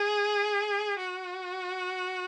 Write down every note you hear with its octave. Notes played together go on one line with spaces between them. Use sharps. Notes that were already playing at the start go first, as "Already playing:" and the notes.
Already playing: G#4
F#4